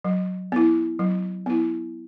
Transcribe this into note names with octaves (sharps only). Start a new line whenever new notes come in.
F#3
B3 E4
F#3
B3 E4